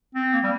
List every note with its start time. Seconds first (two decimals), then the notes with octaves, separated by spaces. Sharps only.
0.15 C4
0.33 A#3
0.43 G3